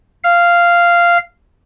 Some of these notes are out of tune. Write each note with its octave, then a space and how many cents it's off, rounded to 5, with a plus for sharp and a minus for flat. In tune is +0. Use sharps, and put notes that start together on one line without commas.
F5 -10